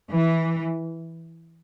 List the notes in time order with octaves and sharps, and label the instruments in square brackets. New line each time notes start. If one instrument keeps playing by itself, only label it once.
[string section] E3